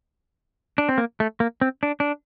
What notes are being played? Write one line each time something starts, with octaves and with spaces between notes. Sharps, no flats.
D4
C4
A#3
A3
A#3
C4
D4
D4